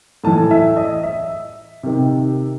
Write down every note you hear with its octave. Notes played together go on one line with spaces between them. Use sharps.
A2 E3 A5
E5
D#5
E5
C3 D#3